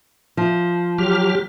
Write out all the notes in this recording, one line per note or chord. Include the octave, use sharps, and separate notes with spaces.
F3
F#3 G4 F6